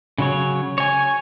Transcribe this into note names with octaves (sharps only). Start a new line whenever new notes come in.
C#3 F#3 C#5
C#5 G#5